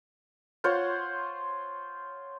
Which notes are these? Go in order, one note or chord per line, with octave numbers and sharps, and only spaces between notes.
F4 C5 C#5 F#5